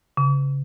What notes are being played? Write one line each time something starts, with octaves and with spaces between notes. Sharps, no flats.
C#3